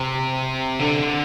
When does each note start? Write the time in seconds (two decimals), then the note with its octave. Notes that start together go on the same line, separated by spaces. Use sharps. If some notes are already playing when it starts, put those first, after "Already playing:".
Already playing: C3
0.79 D3